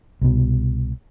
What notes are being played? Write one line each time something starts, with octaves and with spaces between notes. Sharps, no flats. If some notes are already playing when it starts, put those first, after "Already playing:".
C2 B2